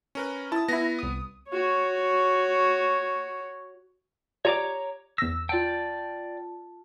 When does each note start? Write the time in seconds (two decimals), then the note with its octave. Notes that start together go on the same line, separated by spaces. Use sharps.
0.15 C#4 A#4 B4
0.52 E4 A5 D#6
0.68 B3 E4 A#6
0.99 C2 D#6
1.49 F#4 C#5
4.45 F4 G4 C#5 D5 A#5 D6
5.18 E2 E6 A#6
5.49 F4 D5 G5 A5